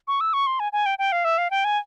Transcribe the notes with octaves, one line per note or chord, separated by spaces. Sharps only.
C#6
E6
C#6
C6
G#5
G#5
G5
G5
F5
E5
F5
G5
G#5